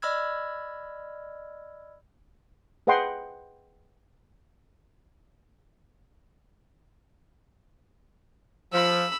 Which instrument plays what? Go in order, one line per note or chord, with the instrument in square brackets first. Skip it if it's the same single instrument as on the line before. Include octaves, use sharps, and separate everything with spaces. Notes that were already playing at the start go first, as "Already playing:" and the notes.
[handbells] D5 D#5 B5 E6 F6 G#6
[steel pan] G#4 B4 D#5 F#5 G5 C6
[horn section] F3 [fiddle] B5 E6